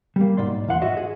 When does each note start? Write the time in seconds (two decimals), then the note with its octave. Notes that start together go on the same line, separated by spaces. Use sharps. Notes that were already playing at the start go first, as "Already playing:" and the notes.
0.16 G3 A#3
0.37 B1 G#2 D5 C6
0.67 E2 E3 F5 F#5 C6
0.81 F4 F#4 D#5 E5
0.97 G#4